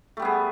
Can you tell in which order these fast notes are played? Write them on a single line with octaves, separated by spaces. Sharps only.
A3 G3 B3 G#4